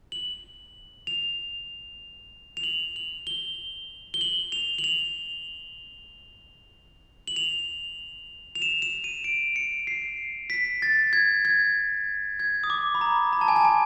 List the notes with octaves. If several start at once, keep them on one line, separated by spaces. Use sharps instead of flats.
F#7
F7
F7
F#7
F#7
G7
G7
F#7
F7
F#7
F7
F#7
F7
F7
E7
E7
D#7
D7
C#7
C7
B6
A6
G#6
G#6
G#6
D#6
D6
B5
A#5
A#5
A5
G#5
A5
G#5